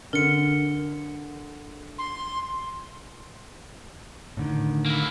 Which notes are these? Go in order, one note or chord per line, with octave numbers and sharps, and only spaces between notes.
D3 A#4 C#7
C6
A2 D3 D#3
A#3 E4